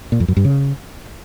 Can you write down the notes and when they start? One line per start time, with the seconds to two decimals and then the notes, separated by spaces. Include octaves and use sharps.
0.12 A#2
0.20 F2
0.28 F#2
0.37 G2
0.45 C#3